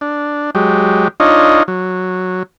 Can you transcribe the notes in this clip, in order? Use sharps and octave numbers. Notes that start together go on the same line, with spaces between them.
D4
F#3 G#3 G4
D4 D#4 F4 C#5 D#5
F#3